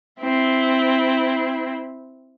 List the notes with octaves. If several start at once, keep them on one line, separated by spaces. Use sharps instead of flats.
C4 E4